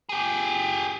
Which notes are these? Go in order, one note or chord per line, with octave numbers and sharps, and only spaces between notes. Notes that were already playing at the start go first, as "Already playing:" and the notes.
G4 G#4